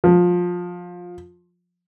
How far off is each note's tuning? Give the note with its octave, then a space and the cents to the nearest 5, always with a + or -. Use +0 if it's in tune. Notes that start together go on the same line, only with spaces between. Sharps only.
F3 +20